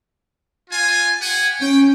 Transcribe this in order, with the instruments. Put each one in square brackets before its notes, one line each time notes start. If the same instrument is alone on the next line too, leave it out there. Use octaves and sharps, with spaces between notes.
[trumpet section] F4 G#5
G4 F#5 G#5
[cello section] C#4 [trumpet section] G5